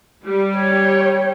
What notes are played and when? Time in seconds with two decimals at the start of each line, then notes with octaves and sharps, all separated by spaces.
0.25 G3
0.56 C#5 G5